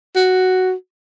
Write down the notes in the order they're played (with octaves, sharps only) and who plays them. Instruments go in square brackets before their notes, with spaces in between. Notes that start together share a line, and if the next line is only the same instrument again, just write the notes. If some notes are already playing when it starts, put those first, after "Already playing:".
[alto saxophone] F#4